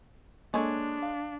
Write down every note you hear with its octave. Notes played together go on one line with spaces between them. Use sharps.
G#3 A#3 D4 A4 C#5
F5